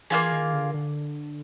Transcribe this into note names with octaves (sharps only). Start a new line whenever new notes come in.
E3 A#3 D4 F4 G#4
D#3
D3
D3